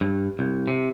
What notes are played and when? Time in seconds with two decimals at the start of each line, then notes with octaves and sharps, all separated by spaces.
0.01 G2
0.39 C2
0.68 C3